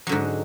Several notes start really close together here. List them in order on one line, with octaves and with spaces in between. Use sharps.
F#3 D3 G#2